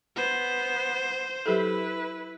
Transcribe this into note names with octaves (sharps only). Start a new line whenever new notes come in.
B3 C5
F#3 E4 G4 A4 B4